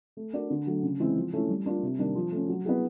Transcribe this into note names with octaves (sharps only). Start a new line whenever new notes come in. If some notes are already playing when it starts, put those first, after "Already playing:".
A3
D4 F#4 A#4 D5
D3
F#3 A3
C#3
E3 G#3 C4 E4
F3
A3 C#4 E4
G3
A#3 D4 F4
C3
D#3 G3 A#3 D4
F3
A3 C#4
F#3
B3 E4 G#4